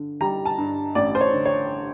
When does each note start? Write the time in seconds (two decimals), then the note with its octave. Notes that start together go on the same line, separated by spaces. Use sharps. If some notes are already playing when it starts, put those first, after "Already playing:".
Already playing: G2 D3
0.21 G3 A#5
0.45 A5
0.58 G2
0.95 A1 D5
1.15 C5
1.21 C#5
1.33 D3
1.45 C#5